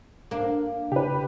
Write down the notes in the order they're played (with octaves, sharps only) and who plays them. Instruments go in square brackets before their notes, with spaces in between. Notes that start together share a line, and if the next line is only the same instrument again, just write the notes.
[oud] A#3 D4
[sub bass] C#3 [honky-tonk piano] G4 B4